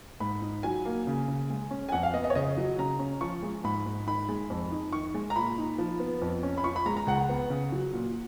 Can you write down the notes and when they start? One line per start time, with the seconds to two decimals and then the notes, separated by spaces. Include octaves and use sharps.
0.20 G#2 B5
0.42 D#4
0.63 F#3 G#5
0.85 A#3
1.07 C#3
1.28 C#3
1.50 G#3
1.71 C#4
1.89 G#5
1.92 F2 F#5
2.03 F5
2.13 B3 D#5
2.24 D#5
2.30 C#5
2.35 C#3 D#5
2.57 F#3
2.78 C#3 A#5
2.99 C#4
3.21 F3 C#6
3.43 G#3
3.64 G#2 B5
3.86 G#2
4.07 D#3 B5
4.29 G#3
4.50 F2
4.71 D#4
4.92 D#3 C#6
5.14 G#3
5.30 A#5
5.36 A#2 B5
5.58 D#4
5.78 F3
6.00 B3
6.22 F2
6.43 C#4
6.58 B5
6.64 F3 C#6
6.76 B5
6.86 G#3 A#5
6.97 A#5
7.07 C#2 F#5
7.29 B3
7.50 C#3
7.72 F#3
7.93 A#2